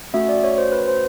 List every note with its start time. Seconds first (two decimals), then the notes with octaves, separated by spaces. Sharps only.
0.13 A3 C#4 F#4 E5
0.29 D5
0.44 C#5
0.58 C5
0.72 B4
0.88 C5